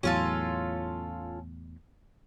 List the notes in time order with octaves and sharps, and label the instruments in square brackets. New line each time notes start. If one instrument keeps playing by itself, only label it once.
[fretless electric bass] E2 A2 F#3 [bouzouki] C#4 F4 A4